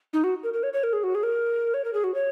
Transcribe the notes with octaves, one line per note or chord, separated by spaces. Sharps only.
D#4
F#4
A#4
A#4
C#5
C#5
A#4
G#4
F#4
G#4
A#4
C#5
A#4
G#4
F#4
C#5